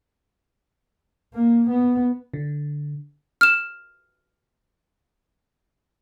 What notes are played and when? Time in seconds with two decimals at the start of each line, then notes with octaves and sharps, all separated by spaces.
1.34 A#3
1.70 B3
2.34 D3
3.41 F6 E7